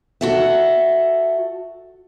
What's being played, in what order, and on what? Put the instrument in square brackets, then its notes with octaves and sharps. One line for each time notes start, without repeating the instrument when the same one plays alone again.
[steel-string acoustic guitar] F#4 A4 E5